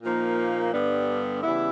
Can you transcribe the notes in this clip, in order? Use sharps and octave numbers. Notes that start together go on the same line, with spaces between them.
A#2 F3 A#3 D#4
G2 D3 G3 B3 D4
C#3 E3 G3 B3 E4